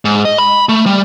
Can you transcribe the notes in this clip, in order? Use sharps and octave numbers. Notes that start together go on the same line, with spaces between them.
G#2
D#5
B5
A3
G3